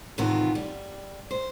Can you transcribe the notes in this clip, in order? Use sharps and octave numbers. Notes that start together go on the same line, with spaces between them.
A2 C3 D#3 E3 B3 F4
G3
C5